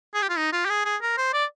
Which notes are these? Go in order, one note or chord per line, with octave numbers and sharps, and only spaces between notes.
G#4
G4
F4
D#4
F4
G4
G#4
G#4
A#4
C5
D5